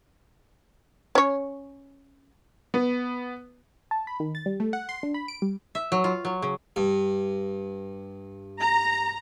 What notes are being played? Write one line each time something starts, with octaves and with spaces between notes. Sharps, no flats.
C#4 C#5
B3
A5
B5
D#3
A6
G3
A3
F#5
C6
D4
B5
D7
G3
E5
F#3
F4
F#3
C#3
G2
A#5